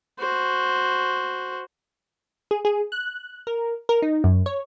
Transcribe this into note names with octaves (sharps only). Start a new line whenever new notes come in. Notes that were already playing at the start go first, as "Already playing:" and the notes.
F#4 C5
G#4
G#4
F#6
A#4
A#4
D#4
F#2
C#5